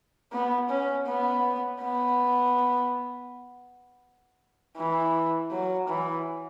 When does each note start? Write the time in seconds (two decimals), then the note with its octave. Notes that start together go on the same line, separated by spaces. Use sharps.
0.32 B3
0.69 C#4
1.06 B3
1.81 B3
4.77 E3
5.51 F#3
5.88 E3